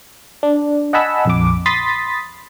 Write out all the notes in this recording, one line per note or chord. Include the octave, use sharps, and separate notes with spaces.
D4
D#5 F#5 G#5 A5 B5 E6
A#1 F2 D6
B5 C6 D#6 A6 B6